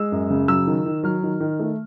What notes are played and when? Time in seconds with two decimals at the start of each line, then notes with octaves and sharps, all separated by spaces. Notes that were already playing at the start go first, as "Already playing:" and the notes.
Already playing: G#3 E6
0.12 F#2
0.30 C#3
0.48 F#3 E6
0.67 D#3
0.86 D#3
1.03 F#3 F6
1.23 D#3
1.40 D#3
1.60 A3